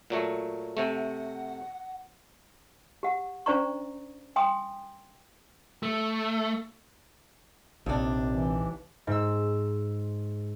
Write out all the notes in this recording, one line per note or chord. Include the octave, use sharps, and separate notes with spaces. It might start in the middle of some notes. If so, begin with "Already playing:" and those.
A#2 F#3 A3
C3 A3 F#5
G4 F#5
C#4 D4 C5 D5 A#5 C#6
G5 G#5 C6 D#6
A3
A#1 D#2 C3 D4
E3
G#2 E6